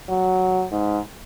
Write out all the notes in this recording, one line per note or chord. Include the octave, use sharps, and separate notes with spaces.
F#3
G#2